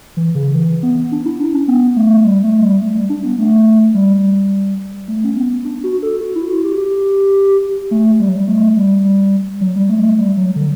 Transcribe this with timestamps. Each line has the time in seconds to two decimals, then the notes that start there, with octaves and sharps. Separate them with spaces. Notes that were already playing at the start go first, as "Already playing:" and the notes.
0.17 E3
0.35 C#3
0.54 E3
0.83 B3
1.12 D4
1.25 E4
1.39 D4
1.54 C#4
1.68 B3
1.96 A3
2.24 G3
2.43 A3
2.62 G3
2.82 A3
2.95 G3
3.09 D4
3.24 B3
3.38 A3
3.94 G3
5.08 A3
5.24 C#4
5.36 B3
5.65 D4
5.84 F#4
6.02 A4
6.21 F#4
6.35 E4
6.50 F#4
6.64 G4
6.78 G4
7.91 A3
8.20 G3
8.28 F#3
8.36 G3
8.48 A3
8.77 G3
9.61 F#3
9.76 G3
9.89 A3
10.03 A3
10.18 G3
10.37 F#3
10.56 D3